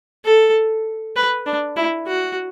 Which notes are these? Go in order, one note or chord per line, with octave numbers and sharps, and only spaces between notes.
A4
B4
D4
E4
F#4